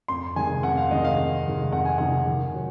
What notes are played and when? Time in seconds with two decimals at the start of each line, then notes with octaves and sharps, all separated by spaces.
0.08 F2 C6
0.36 C3 D#3 G#3 G#5
0.63 F2 F#5
0.77 F5
0.91 C3 D#3 G#3 D#5
1.04 F5
1.18 F2
1.45 C3 D#3 G#3
1.72 F2 F#5
1.85 G#5
1.98 C3 D#3 G#3 F#5
2.27 D#3
2.54 F#3